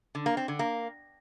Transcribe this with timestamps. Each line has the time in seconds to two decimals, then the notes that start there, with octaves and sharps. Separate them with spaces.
0.15 D3
0.26 A#3
0.37 C4
0.48 D3
0.59 A#3